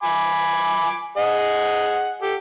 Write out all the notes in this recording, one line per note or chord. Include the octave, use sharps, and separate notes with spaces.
G#5 B5 D6
G#4 D#5 F#5
G4 A4